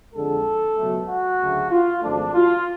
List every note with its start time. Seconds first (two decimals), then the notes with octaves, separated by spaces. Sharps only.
0.14 F2 D3 G#3 A4
0.77 C#2 B2 F#3 A3
1.08 F#4
1.40 D2 C#3 F#3 A3
1.71 F4
2.02 G#1 F#2 F3 A3 D4
2.34 F4